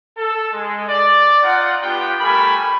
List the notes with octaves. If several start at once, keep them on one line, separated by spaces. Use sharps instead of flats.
A4
G#3
D5
D#4 F4 F#5
B3 D4 F4 G4 G5
G3 A3 A#4 G#5 B5